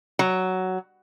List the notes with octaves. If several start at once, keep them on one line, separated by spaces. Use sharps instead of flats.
F#3